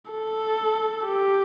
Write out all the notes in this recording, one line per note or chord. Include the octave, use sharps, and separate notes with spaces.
A4
G4